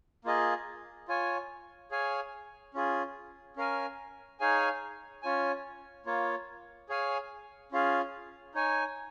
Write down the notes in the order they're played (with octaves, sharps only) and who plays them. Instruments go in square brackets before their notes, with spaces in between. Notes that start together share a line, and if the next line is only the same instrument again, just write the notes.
[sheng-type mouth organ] A#3 F4 G#4 D#5
F4 C#5 G#5
G#4 C#5 F5 G#5
C#4 F4 G#4
C#4 A#4 F5 G#5
D#4 G#4 C#5 F5 G#5
C#4 F4 C#5 G#5
A#3 F4 C#5
G#4 C#5 F5 G#5
C#4 F4 G#4 F5
D#4 C#5 G#5